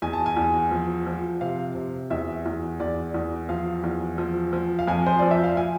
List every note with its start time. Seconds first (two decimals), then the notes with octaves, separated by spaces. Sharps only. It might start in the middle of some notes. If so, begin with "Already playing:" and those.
0.02 E2 G#5
0.13 A5
0.26 G#5
0.37 E2
0.71 F3
1.07 F3
1.41 C3 F5
1.75 C3
2.10 E2 E5
2.46 E2
2.80 E2 D5
3.14 E2
3.49 F3 F5
3.84 E2
4.18 F3
4.53 F3
4.79 F5
4.88 F2 G#5
5.06 C5
5.19 F3 D5
5.31 E5
5.44 F5
5.57 F3 G#5